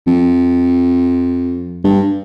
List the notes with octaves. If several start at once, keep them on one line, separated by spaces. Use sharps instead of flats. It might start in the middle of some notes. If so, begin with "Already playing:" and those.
F2
G2